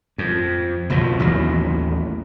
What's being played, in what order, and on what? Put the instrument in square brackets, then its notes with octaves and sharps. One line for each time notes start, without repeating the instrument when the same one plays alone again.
[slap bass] F2
F#1 B1 B2 F3
A1 D#2 B2 F#3